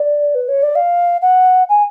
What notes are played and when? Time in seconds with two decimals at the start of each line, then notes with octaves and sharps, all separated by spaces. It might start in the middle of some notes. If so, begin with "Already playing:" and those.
Already playing: D5
0.35 B4
0.48 C#5
0.63 D5
0.75 F5
1.22 F#5
1.69 G#5